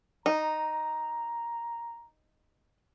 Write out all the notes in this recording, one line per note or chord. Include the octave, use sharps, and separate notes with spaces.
D#4 A#5